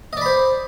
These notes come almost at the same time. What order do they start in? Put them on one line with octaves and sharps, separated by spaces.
D#5 D5 B5 C5